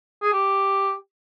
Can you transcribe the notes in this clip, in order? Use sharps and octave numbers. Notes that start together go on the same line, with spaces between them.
G#4
G4